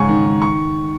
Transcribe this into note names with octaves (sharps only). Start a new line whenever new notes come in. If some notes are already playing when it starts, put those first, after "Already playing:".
Already playing: G#2 C#3 G#5 C#6
D#3
D#3
C#6